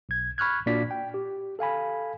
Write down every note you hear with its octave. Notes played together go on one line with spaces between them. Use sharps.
B1 G#6
B5 C#6 F6 F#6 G#6
A#2 A#3 D4 F#4 D5 B6
G5
G4
A4 F5 G#5 B5